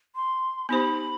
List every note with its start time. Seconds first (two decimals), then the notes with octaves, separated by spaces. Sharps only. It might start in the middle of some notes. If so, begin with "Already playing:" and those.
0.16 C6
0.69 B3 D#4 G4 C5 B5